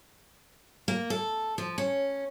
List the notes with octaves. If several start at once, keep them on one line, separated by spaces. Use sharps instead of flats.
A#3
A4
F3
C#4